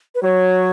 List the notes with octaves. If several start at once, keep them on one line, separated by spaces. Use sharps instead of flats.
B4
F#3 C#5